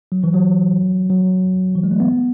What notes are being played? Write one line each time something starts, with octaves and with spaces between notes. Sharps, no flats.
F#3
E3
F#3
F#3
E3
G#3
A3
B3